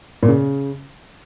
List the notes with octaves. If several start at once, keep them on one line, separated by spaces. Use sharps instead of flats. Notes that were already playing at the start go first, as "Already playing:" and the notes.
A#2
C#3